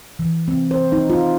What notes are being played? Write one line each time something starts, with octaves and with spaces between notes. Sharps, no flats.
E3
C4
C5
D#4
F4